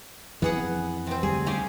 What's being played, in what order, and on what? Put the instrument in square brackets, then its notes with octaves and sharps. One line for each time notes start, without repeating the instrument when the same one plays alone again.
[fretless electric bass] F2 E3 [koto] B3 G#4 F#5
[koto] C3 C4
[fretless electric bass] D2 G3 [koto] G#4
[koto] C#3 G4 G#4